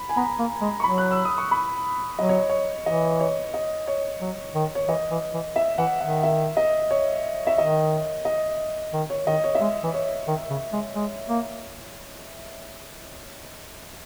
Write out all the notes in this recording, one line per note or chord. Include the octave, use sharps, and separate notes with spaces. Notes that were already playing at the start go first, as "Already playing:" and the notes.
Already playing: B5
G#5
B3 A#5
A#3
G#3
C#6
F#3 B5
F#6
E6
D#6
C#6
B5
F#3 D#5
C#5
C#5
E3 D#5
C#5
D#5
C#5
F#3
D#3
C#5
E3 D#5
E3
E3
E5
E3 F#5
D#3 F#5
E5
D#5
C#5
E5
D#3 D#5
D#5
D#3
C#5
D#3 D#5
C#5
E5
G#3 D#5
E3
C#5
D#3
C#3
G#3
G#3
A#3